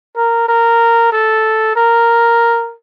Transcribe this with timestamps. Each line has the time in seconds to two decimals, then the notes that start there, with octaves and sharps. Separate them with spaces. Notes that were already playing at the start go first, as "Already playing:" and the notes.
0.16 A#4
0.48 A#4
1.12 A4
1.76 A#4